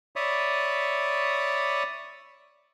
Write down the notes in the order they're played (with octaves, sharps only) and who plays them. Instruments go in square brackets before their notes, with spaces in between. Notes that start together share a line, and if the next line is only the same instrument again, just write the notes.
[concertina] C#5 D5 E5 B5 D#6